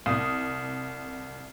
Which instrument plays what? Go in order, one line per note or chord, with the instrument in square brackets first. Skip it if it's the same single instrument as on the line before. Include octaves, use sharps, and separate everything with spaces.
[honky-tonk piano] C2 D#6